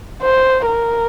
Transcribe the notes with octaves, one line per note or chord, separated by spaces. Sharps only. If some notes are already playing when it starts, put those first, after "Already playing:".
C5
A#4